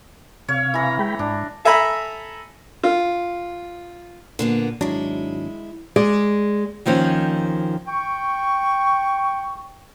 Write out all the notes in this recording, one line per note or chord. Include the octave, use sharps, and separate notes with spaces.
C3 C#5 F5
E3 A#5
G#3 G5 B5
G#2 D4
A4 E5 G#5 A#5 B5
F4
A#2 D3 A#3 B3
G#1 F#3 G#3 D4 E4
G#3 G#4 D5
D#2 D#3 F3 C4 C#4
G5 C#6